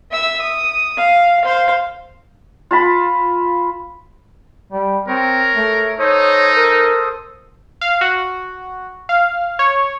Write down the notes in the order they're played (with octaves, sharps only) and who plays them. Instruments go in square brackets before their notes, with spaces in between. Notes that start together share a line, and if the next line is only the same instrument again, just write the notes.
[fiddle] E5 E6
D#6
F5
C5 F5
[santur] F4 A5 B5
[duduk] G3
[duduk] C4 [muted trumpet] A#4 [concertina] C#5
[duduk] A3
[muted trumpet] D#4 [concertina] A4 C5 D#6 [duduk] C#5
[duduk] A#4
[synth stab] F5
F#4
F5
C#5